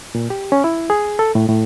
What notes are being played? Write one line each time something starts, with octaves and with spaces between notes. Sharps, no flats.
A#2
G4
C#4
E4
G#4
A4
A2
A2